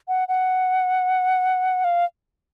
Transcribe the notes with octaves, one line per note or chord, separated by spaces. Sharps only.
F#5
F#5
F5